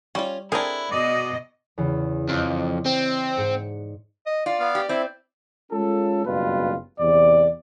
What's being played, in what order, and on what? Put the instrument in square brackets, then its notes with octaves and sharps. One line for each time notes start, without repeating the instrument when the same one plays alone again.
[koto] G3 [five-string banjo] C#4 F4
[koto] C4 G#4 A#4 [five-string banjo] D4 G#5 [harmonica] E4
[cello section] B2 D#5 [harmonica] D5
[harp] E2 C#3
[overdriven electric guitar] F2 [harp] C5 D5 D#5
[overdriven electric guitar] C4
[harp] G#2 C#7
[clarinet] D#5
[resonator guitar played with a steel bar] F4 [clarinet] D5
[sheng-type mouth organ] B3 F5
[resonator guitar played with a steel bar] G4
[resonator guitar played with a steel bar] C4 [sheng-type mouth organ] E4
[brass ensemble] G#3 C#4 F4 A4
F#1 G2 B2 F4 B4
E2 C3 D5